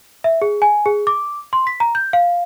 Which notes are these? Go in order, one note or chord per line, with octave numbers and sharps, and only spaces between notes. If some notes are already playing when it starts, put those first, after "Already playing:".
E5
G#4
G#5
G#4
D6
C6
B6
A#5
G6
F5